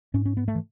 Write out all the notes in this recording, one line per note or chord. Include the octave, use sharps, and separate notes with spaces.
G#2 C#4
C#4
B3
A3
E3